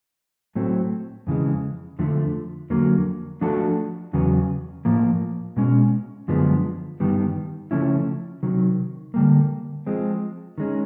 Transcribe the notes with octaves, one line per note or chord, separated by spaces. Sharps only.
A2 F#3 A3 C4
F2 C#3 E3 G#3
F2 D3 F3 A3
F2 D3 F#3 A#3
F3 A3 D4 F#4 A4
E2 C#3 F#3 B3
A2 F3 A#3
B2 G#3 C#4
F#2 D3 F3 G#3 B3
G2 D#3 G3 B3
C#3 F3 A3 C#4 E4
C3 D#3 F#3
D3 G3 A#3
F3 G#3 C4
D#3 G#3 C#4